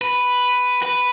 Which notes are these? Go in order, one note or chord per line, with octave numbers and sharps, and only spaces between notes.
B4
B4